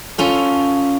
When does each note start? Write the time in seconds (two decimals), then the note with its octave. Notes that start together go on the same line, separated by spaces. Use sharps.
0.18 C#4 F4 A4